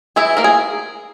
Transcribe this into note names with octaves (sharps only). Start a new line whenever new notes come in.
E3 E4 G#4
A#3 A#4
G#4